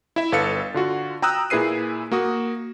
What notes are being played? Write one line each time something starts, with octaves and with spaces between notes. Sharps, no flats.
E4 E5
G1 A4 B4 F5 A6 C#7
D3 F4 F#4
G5 A#5 D#6 E6 F#6
A#2 E4 G#4 B4 C7 D#7
A#3 F#4 D#6